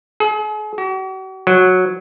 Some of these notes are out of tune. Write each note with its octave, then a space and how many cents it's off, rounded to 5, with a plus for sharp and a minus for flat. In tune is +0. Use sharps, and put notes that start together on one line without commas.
G#4 +40
F#4 +45
F#3 -10